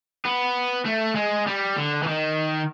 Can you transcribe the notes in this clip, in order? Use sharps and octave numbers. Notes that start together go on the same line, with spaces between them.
B3
A3
G#3
G3
D3
E3
D#3